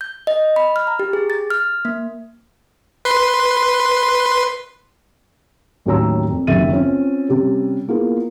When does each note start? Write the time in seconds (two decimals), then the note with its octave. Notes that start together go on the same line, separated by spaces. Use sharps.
0.01 G6
0.27 D#5
0.56 B5
0.76 F6
0.87 A#5
0.99 G4
1.13 G#4
1.30 A6
1.50 F6
1.85 A#3
3.05 B4 C6
5.86 A1 D#2 F#3 C#5 A#5 E6
6.28 F2
6.47 F#1 D#2 E5 A6 D#7
6.72 C4 C#4 F4
7.29 C3 G3 C#4
7.88 A#3 B3 E4 F4 G#4 A#4